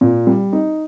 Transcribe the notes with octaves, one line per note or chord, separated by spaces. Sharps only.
A#2
G3
D#4